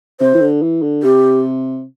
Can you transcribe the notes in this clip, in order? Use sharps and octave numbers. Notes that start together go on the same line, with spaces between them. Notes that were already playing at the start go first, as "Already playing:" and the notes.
C3 C5
E3
D3
E3
D3
C3 G4